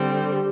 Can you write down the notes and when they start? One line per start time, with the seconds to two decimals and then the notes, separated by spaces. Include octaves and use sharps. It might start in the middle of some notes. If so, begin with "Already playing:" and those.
Already playing: D3 G3 C4 A4
0.32 G4